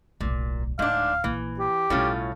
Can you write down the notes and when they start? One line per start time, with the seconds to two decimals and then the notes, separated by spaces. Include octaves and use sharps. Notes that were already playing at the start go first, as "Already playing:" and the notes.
0.20 D1 B1 A#2
0.79 D1 G#2 D4 F5
1.24 A#1 E3 A#3
1.59 G4
1.90 B1 A2 G3 C#4 F4